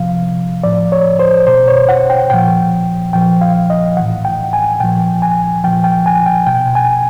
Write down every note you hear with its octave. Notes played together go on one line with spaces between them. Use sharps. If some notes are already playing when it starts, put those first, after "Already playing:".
Already playing: C3 F3 F5
A2 F3 D5
C#5
C5
B2 C5
C#5
F#5
G5
A#2 F3 G5
A#2 F3 G5
F5
D#5
A2 E3 F#5
G5
G#5
A#2 F3 G5
G#5
A#2 F3 G5
G5
G#5
G5
B2 G5
G#5